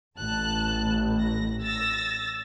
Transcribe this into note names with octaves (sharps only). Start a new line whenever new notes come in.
A1 A5 F#6
A#6
E6 A6 A#6